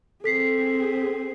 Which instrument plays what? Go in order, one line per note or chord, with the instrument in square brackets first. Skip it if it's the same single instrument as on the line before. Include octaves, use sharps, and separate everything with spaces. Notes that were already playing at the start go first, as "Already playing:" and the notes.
[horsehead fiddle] C4 G#4 [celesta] A4 B6 C7